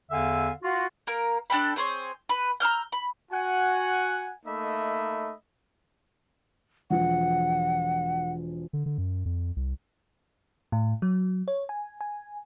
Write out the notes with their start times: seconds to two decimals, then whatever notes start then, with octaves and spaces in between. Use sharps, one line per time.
0.11 E2 D3 E5 F5 G#5
0.63 F4 F#4
1.07 A#3 A#4
1.50 D4 A4 G5 B5
1.76 C4 G#4 C5 C#5
2.29 B4 B5
2.60 A#5 E6 F6 G6
2.92 B5
3.31 F#4 F#5 G#5
4.46 A3 A#3 D#4 D#5 E5 B5
6.90 E1 F3 F#5
8.73 D3
8.86 D3
8.98 F#2
9.25 F2
9.56 C2
10.72 A2
11.02 F#3
11.48 C#5
11.69 G#5
12.01 G#5